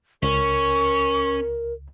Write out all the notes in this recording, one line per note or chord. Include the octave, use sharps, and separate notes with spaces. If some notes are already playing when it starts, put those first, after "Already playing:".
C#2 C#4 A#4 C#6